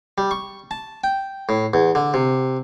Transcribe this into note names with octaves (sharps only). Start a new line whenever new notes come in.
G3
C#6
A5
G5
A2
E2
D3
C3